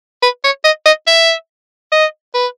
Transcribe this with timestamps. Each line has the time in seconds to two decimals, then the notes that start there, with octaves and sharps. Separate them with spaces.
0.23 B4
0.44 C#5
0.65 D#5
0.86 D#5
1.07 E5
1.92 D#5
2.34 B4